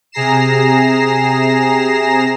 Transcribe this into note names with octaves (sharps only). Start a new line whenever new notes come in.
C3 G#4 A#5 A#6 C7 E7